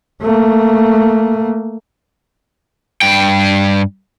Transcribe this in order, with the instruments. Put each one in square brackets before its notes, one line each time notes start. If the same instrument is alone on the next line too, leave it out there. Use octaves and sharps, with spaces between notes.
[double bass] A3 A#3
[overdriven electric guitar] G2 G5